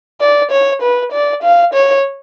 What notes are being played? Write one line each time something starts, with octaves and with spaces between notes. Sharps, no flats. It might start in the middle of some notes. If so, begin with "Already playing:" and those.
D5
C#5
B4
D5
F5
C#5